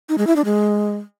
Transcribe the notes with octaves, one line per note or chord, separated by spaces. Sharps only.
D#4
G#3
E4
D4
G#3